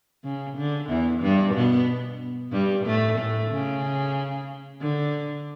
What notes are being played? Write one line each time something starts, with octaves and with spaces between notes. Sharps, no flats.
C#3
D3
E2 E3
G2 G3
B2 B3
G2 G3
A2 A3
A2 A3
C#3
D3